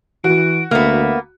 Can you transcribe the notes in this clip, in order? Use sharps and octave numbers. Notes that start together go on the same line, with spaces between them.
E3 F#4 D7
D2 A#3 B3 E5